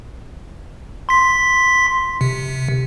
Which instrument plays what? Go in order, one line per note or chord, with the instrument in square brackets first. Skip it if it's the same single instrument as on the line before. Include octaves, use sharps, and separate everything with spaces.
[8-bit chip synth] C6 B6
C3